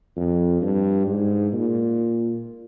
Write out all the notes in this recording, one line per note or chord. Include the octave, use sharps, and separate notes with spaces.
F2
G2
G#2
A#2